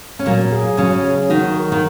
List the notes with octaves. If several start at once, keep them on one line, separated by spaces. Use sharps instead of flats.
C#4
A#2 F#3 A#3
G#4
C#3 F#3 C#4
G#4
D#3 D#4 F#4
A#4
D#3